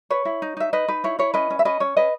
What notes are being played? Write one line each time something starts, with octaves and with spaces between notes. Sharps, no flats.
B4 C#5
E4
D#4
D#4 E5
D#4 B4 D#5
D#4 B4
E4 C#5
E4 C#5
C#4 B4 D#5
C#4
E5
C#4 B4 D#5
C#4 C#5
C#4 B4 D#5